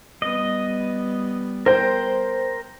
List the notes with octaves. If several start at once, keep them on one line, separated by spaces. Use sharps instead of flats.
G3 B3 D#5
A#4 C5 G5